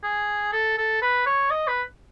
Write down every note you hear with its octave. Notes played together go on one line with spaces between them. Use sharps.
G#4
A4
A4
B4
C#5
D#5
B4